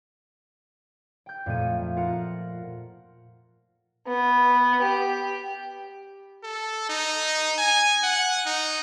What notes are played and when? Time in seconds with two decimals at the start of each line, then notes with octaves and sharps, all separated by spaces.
1.26 G5 G6
1.46 F2 A#2 A3 D#7
1.96 F4 A#4 F#5
4.07 B3
4.82 G4
6.43 A4
6.89 D#4
7.58 G#5
8.03 F#5
8.46 D#4